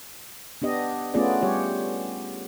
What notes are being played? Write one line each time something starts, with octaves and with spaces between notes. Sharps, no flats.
B3 D4 G4 D#5
A3 B3 C#4 F4 G#4 D5
G3 G4 C#5